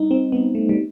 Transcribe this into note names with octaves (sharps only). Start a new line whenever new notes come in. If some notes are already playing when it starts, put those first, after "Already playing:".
Already playing: G3 D#4
C4
B3
A3
G3